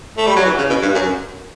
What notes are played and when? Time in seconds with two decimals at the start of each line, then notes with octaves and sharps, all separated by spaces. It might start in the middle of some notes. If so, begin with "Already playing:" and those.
0.18 A3
0.27 G3
0.36 F#3
0.45 E3
0.58 C#3
0.70 B2
0.82 G2
0.95 F#2